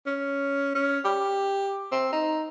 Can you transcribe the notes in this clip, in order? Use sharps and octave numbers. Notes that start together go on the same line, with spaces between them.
C#4
C#4
G4
C4
D#4